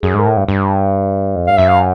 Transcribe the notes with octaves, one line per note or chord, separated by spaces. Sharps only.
F#2 G#4
G#2 A#4
A2
G2
G2
F2
G2 F5
F#2 E5
F5